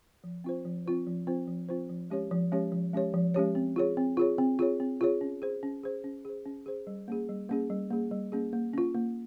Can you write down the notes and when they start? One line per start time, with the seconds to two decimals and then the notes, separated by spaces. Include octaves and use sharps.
0.24 F3
0.44 C4 F4 C5
0.65 F3
0.86 C4 F4 C5
1.07 F3
1.27 C4 F4 C5
1.47 F3
1.69 C4 F4 C5
1.89 F3
2.10 G#3 C#4 G4 C#5
2.31 F3
2.52 G#3 C#4 G4 C#5
2.72 F3
2.93 G#3 C#4 G4 C#5
3.14 F3
3.34 G#3 C#4 G4 C#5
3.55 C4
3.76 F4 G#4 C#5
3.97 C4
4.17 F4 G#4 C#5
4.38 C4
4.59 F4 G#4 C#5
4.80 C4
5.01 F4 G#4 C#5
5.21 C#4
5.42 G#4 C5
5.63 C#4
5.83 G#4 C5
6.04 C#4
6.25 G#4 C5
6.46 C#4
6.66 G#4 C5
6.87 G3
7.08 A#3 C#4 G#4
7.29 G3
7.49 A#3 C#4 G#4
7.70 G3
7.91 A#3 C#4 G#4
8.11 G3
8.32 A#3 C#4 G#4
8.53 A#3
8.74 C#4 F4
8.94 A#3